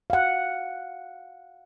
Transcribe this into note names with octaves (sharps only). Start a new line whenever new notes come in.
F5 F#5